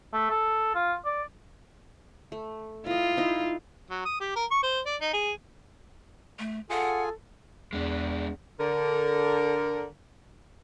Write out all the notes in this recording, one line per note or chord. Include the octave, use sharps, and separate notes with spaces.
A3
A4
F4
D5
A3
E4 F4 D#5
D#4 E4 D#5
F#3
D#6
G4
A#4
C#6
C5
D5
D#4
G#4
A3
F4 G#4 A4 F#5 G#5
E2 G#3 D4
D3 A#4